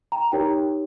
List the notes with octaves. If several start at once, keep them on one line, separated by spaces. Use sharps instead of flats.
G5 A#5
D#4 G4 A#4 C#5 G5 A#5